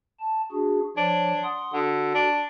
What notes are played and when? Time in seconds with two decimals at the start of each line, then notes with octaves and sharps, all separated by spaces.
0.20 A5
0.52 D4 F#4 G#4
0.97 F3 D4 C#5
1.43 F#5 C6 D#6
1.73 D3 F#4
2.15 D4